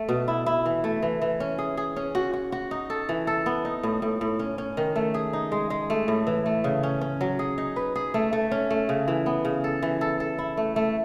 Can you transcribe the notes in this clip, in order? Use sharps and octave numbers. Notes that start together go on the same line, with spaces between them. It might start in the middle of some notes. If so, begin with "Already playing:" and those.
Already playing: A3
B2
E4
E4
E3
A3
E3
E3
C#4
G#4
G#4
C#4
F#4
F#4
F#4
D#4
A4
E3
A4
B3
D#4
A2
A2
A2
C#4
C#4
D#3
A3
G#4
D#4
G#3
G#3
A3
A2
E3
A3
C#3
C#4
C#4
F#3
G#4
D#4
B4
G#4
A3
A3
C#4
A3
C#3
E3
B3
C#3
A4
E3
A4
A4
E4
A3
A3